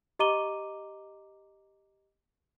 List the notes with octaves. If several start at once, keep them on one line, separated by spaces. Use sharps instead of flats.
G4 D#5 A#5 D6 D#7 G7